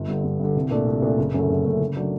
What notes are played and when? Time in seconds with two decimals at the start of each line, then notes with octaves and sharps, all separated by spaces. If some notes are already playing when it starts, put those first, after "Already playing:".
Already playing: G1
0.08 G2 D3
0.24 G1
0.40 G2 D3
0.56 C2
0.71 A#2 A3 D4
0.87 C2
1.02 A#2 A3 D4
1.18 F#1
1.34 F#2 D3 A3
1.50 F#1
1.65 F#2 D3 A3
1.80 F#1
1.96 F#3 A3 D4